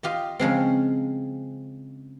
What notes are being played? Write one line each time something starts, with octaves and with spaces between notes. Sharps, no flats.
F4 G4 D#5
C#3 F3 G#3 C4